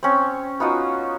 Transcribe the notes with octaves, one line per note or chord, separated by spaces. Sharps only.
C4 C#4
B3 D#4 F4 F#4